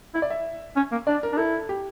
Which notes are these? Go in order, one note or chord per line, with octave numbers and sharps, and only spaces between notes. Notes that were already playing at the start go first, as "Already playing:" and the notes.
E4 E5
D5
E5
C#4
A#3
D4 D5
A#4
D4
E4 A4
G4